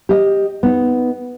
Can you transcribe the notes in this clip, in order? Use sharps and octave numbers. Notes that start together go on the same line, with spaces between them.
G4 D#5
B3 D#4